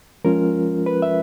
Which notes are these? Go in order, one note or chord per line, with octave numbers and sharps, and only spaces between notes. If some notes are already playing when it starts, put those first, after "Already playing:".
F3 G#3 C#4 F4 A#4
B4
E5